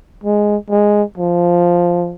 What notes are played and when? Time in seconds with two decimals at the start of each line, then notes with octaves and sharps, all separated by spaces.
0.24 G#3
0.70 G#3
1.18 F3